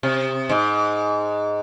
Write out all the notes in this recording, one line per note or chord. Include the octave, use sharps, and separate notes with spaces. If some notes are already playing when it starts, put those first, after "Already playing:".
C3
G#2